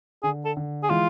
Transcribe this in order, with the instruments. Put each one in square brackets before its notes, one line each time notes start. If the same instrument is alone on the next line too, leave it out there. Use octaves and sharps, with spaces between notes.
[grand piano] D3 [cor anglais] G#4
[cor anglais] A4
[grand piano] D3
[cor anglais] G#4
[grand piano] E3 G#3 [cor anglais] F4